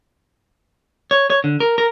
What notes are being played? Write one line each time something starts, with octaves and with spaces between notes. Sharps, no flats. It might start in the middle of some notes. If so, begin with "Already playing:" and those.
C#5
C#5
D3
A#4
A#4